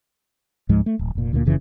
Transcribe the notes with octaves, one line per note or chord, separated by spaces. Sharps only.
C#2 G#2 F3 G#3
A3
D1
F1 A#2
D2 A#2 C#3 A#3
F#1 F2 C#3 E3